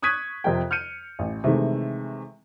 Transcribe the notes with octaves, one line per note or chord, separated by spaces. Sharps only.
C#6 D#6 F#6 G#6 B6 D#7
F2 C3 A#4 G5
F6 G6 C#7 D#7
A1
C3 D#3 E3 G#3 A3